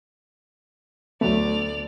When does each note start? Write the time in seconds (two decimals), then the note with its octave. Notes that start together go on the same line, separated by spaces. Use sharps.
1.21 D2 F#3 A3 B3 D5 F7